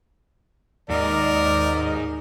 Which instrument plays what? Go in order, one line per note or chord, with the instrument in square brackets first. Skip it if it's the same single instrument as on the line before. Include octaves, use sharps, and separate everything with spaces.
[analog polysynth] D#2 D#5 [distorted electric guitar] G#2 [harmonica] A#4 [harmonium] D5